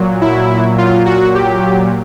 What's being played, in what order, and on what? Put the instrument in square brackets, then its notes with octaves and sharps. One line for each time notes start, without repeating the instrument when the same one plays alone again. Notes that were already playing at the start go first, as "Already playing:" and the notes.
Already playing: [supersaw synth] A#2 F#3
E4
F4
F#4
G4